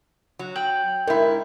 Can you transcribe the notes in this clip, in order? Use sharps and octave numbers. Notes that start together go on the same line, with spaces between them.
F#3
G5 F#7
G#2 E4 A#4